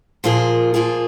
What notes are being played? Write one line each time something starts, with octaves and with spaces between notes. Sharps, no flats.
A#2 F3 A#3 F4 G#4
A#2 F3 A#3 F4 G#4